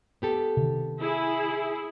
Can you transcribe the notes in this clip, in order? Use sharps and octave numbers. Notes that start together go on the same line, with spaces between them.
B3 G4 A4
C3 D#3
E4 G#4